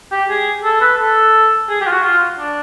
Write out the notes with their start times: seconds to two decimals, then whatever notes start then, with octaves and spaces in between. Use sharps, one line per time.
0.12 G4
0.30 G#4
0.64 A4
0.81 B4
0.99 A4
1.69 G#4
1.81 G4
1.87 F4
1.92 F#4
2.04 F4
2.39 D4